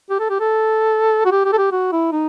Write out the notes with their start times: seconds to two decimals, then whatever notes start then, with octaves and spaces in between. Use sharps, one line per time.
0.10 G4
0.20 A4
0.30 G4
0.40 A4
1.25 F#4
1.31 G4
1.45 G4
1.52 A4
1.58 G4
1.72 F#4
1.92 E4
2.12 D#4